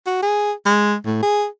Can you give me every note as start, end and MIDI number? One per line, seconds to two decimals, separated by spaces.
0.07 0.22 66
0.23 0.52 68
0.66 0.95 56
1.06 1.18 45
1.22 1.46 68